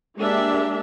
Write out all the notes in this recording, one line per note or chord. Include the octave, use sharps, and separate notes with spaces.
G#3 A#3 D4 G4 E5